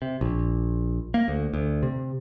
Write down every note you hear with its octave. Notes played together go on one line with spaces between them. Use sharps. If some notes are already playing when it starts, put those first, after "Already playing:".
C3
A#1
A#3
D2
D2
C3